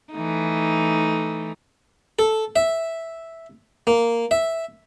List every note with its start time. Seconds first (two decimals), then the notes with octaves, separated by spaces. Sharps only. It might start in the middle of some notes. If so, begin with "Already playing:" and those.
0.13 E3 A3 D#4
2.19 A4
2.56 E5
3.87 A#3
4.31 E5